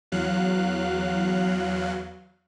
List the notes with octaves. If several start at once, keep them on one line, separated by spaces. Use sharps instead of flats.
E2 F#3 F5 F#6